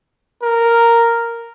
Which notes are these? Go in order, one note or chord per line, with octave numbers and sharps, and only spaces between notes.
A#4